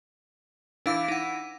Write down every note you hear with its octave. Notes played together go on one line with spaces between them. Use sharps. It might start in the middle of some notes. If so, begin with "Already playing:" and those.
E3 D4 F5 D6
D#4 F#5